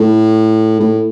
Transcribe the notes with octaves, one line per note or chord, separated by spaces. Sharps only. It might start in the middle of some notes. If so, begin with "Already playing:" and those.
Already playing: A2
A2